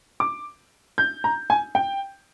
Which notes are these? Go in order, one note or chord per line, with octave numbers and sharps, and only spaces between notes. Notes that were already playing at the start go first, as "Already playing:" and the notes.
D6
G6
A#5
G#5
G5